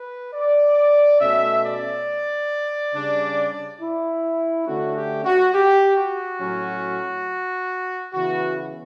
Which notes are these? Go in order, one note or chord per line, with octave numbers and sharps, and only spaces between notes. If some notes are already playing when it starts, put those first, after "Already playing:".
Already playing: B4
D5
B2 A3 C#4 E5
D5
C#3 G3 D4
E4
D3 A3 C#4 F#4
G4
F#4
G4
F#4
A2 F#3 C#4
C#3 E3 B3 F#4